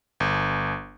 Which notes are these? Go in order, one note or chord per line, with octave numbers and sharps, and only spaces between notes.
G1